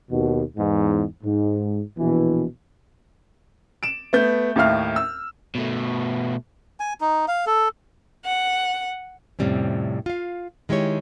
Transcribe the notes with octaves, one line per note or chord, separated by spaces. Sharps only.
D#2 B2
E2 G#2
G#2
A#1 B2 E3
D7 E7
A3 B3 G6
D#2 A2 E4 F5 F6
E6
B2 A3
G#5
D#4
F5
A4
F#5
F2 A2 C3 G3 C4 C#4
F4 F5
D#3 G#3 E4 G4 C#5